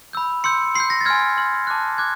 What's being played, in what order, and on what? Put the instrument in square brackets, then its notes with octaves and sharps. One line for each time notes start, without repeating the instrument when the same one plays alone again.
[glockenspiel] B5 E6 G6
C6 E6 G6 C#7
C6 C7
E6 G6
A#6
A6
G#5 C6 F6 G#6
G#5 C6 F6
A5 D6 F#6
D6 F#6 G#6